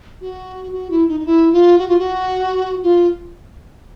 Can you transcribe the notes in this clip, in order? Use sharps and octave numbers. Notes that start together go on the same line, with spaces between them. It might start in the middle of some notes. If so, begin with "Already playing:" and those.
F#4
F#4
E4
D#4
D#4
E4
F4
F#4
F4
F#4
F4